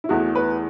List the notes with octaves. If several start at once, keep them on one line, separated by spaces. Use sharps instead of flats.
E4
E2 E3 A3 F#4
B4